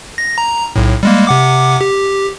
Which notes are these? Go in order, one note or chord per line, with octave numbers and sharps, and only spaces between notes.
A#6
A#5
B1 A2
G3 G#3 A#3
C3 F#5 D6
G4